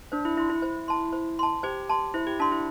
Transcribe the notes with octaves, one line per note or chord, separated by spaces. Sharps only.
D4 C5
E4
E4 E5 C6
E4
C5
A5 C6
C5
A5 C6
G4 C5
A5 C6
E4 C5
G4
D4 A5 C6
E4